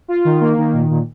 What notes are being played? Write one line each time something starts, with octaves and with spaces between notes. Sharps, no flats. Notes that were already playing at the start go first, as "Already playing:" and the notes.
F4
D#3
A#3
D#3
A#2
A#2